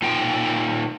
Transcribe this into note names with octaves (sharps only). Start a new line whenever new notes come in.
A#2 D#4 F4 G5